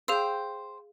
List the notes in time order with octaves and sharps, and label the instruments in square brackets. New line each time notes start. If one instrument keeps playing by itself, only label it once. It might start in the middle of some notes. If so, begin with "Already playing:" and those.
[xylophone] G#4 F5 E6 [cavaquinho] C5 G5